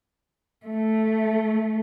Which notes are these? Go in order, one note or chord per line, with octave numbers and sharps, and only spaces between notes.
A3